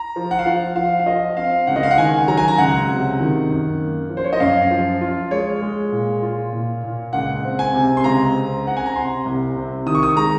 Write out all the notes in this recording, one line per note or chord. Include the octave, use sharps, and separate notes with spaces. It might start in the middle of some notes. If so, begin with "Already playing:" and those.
Already playing: A#5
F3
F#5
F5
F3 F#5
F3 F5
F5
F3 D#5
C4 F5
C#2 F#5
D#5
F5
F#5
D#3 G#5
F#3 A#5
G#5
A#5
C#2 F#5
C3
D#3
F#2
A#3
F3
C5
C#5
D#5
F#2 F5
F3
F4
G#3 C#5
G#3
A#2
F4
A#2
A#2
C#2 F#5
C4
G#5
C3
C6
C#2 A#5
C4
C4 F#5
G#5
A#5
C3 C6
C2
C3
D#3 D#6
C#6
D#6
G#3 A#5